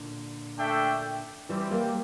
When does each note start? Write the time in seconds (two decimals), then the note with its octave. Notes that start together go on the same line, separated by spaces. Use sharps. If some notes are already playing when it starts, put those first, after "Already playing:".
Already playing: A#2 D3
0.58 A3 D4 A4 E5 G5
1.49 E3 G3 C4 E4 G4
1.71 G3 A#3